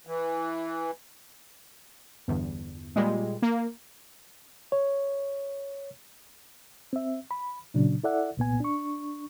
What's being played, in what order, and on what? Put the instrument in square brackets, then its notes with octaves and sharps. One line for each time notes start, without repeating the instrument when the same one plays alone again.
[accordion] E3
[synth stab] G1 E2
A#2 G3 G#3
A#3
[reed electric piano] C#5
C4 E5
B5
A#2 C#3 F#3 D4
E4 A4 D5 E5 F#5
C2 A#2 B3 G#5
D4 C#6